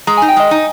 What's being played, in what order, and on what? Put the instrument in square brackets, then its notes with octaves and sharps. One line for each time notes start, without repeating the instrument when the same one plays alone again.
[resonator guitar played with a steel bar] G#3 [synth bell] A#5
[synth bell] G#5
[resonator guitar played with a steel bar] D#4
[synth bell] G5
[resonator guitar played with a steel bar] G#3 [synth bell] D#5
[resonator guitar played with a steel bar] D#4